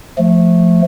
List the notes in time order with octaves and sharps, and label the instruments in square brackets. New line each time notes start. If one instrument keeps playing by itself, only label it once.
[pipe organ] F3 A3